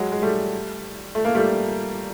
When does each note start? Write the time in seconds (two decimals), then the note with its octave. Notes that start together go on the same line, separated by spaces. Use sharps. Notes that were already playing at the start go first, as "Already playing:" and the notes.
Already playing: F#3 G#3
0.12 G#3
0.22 G3 A3
1.15 A3
1.25 A#3
1.35 G3 A3